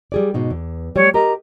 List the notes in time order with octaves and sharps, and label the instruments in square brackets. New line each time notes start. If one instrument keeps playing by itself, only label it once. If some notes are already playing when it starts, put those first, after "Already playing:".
[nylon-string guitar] G3 G#4 D5
G#2 B2 D#4
E2
[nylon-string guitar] G3 A3 [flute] C#5
[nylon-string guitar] G4 A#4 D#5 [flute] A#5